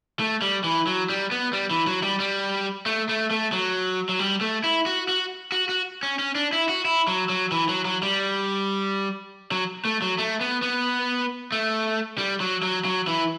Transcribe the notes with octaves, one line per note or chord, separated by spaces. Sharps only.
A3
G3
E3
F#3
G3
B3
G3
E3
F#3
G3
G3
A3
A3
A3
F#3
F#3
G3
A3
E4
F#4
F#4
F#4
F#4
C#4
C#4
D4
E4
F#4
E4
F#3
F#3
E3
F#3
F#3
G3
F#3
A3
F#3
A3
B3
B3
A3
G3
F#3
F#3
F#3
E3